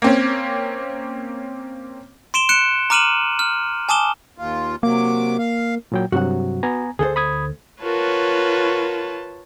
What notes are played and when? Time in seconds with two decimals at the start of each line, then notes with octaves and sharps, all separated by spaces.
0.02 A#3 C4 C#4
2.34 C6 D7 E7 G7
2.49 F#6 C#7 D7 E7
2.90 A#5 D6 F6 D#7 E7 F#7
3.39 F6
3.89 G#5 A5 D6 D#6 E7 G7
4.38 D#2 F4
4.83 C3 F#3 A#3 D6
5.39 F5
5.92 A#2 F#3 G5
6.12 G2 C3 F#3 F#4 F#5
6.63 B3 G#5 A#5
6.99 D2 G#4 A4 C5
7.16 B5 D#6 G#6
7.82 F4 F#4 A#4 B4 C#5 A5